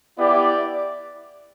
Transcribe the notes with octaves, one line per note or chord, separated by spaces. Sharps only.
B3 E4 G4 D5